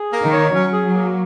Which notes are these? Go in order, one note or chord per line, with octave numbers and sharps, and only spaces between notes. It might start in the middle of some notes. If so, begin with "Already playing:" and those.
Already playing: G#4
A#3
D#3
C#5
F#3 C#4
G#4
F#3
A#3